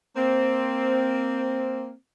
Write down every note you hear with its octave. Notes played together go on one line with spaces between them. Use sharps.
A#3 C4